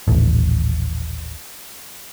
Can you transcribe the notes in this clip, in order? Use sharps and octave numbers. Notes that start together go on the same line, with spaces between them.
D#1 A1